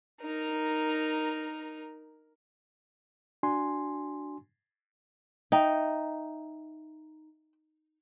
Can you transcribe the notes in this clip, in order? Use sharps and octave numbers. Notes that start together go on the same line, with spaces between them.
D#4 A#4
D4 F#4 G#5 C6
D#4 E5 G5